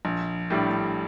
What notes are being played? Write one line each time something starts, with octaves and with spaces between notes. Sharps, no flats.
A#1
A2 G3 D4